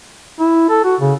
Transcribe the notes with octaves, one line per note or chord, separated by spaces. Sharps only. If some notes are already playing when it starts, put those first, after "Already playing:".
E4
A4
F#4
C#3